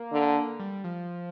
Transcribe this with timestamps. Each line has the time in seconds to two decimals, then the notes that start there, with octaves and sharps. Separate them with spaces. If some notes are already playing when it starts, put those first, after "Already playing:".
Already playing: A#3
0.12 D3
0.59 G3
0.84 F3